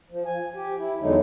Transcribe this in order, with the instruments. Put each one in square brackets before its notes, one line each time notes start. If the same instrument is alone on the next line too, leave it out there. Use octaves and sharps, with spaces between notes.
[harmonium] F3
G#5
G4
E4
E2 D3 F#3 G#3 D#4